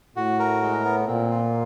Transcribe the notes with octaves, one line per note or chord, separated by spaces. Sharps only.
A2 F#4
A#4
G#3
B3
A#2 C4
F4